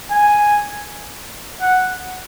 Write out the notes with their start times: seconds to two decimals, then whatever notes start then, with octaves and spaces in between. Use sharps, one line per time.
0.11 G#5
1.61 F#5